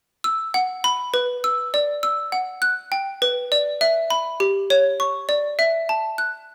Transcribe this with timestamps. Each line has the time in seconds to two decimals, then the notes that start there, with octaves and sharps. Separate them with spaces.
0.24 E6
0.54 F#5
0.84 B5
1.14 B4
1.44 E6
1.74 D5
2.03 E6
2.32 F#5
2.62 F#6
2.92 G5
3.22 B4
3.52 D5
3.81 E5
4.10 B5
4.40 G4
4.70 C#5
5.00 C#6
5.29 D5
5.59 E5
5.89 A5
6.18 F#6